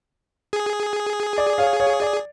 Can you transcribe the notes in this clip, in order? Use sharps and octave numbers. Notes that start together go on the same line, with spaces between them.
G#4
D5
C#5 F5
C#5 F5
D5